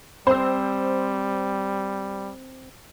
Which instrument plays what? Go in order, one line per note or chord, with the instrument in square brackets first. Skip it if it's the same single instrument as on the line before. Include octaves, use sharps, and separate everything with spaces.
[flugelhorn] G3 [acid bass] C4 [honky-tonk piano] C5 E6